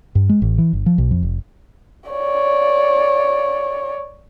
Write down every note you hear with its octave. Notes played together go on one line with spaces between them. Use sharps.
G2
G#3
A1
E3
G1
F3
B1
F2
F1
C#5 D5